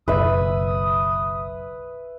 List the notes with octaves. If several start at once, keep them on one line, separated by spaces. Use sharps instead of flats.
F#1 B1 B4 E5 D#6